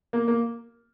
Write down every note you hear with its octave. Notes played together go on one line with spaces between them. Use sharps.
A#3
A#3